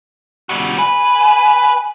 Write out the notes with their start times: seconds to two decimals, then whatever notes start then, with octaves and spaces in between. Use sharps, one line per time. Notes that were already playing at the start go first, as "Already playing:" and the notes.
0.49 G3 F#4
0.78 B4 G#5